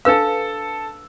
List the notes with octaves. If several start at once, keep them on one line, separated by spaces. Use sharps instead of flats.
D4 A4 B4 F5 E6